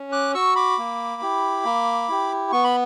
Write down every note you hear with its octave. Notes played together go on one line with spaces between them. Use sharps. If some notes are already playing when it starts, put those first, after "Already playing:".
Already playing: C#4
D6 F#6
F#4 C#6 E6
B5 D6
A#3
E4 G4
A#3
E4 G4
B3 C#6
B5